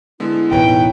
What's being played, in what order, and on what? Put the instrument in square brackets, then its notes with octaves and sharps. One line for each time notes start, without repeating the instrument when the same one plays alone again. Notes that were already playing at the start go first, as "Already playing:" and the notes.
[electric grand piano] D3 G#3 B3 [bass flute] E4
[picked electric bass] A1 E2 B2 [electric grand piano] D#4 B4 C#5 [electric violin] G5